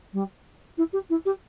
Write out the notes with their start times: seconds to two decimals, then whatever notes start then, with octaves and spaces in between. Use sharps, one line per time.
0.13 G3
0.78 E4
0.93 G4
1.10 E4
1.26 G4